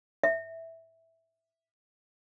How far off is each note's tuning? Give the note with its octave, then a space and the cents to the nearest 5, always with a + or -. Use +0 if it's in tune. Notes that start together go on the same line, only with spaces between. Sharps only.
E5 -5